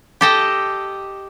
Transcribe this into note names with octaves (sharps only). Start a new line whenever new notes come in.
G4 A4 D#5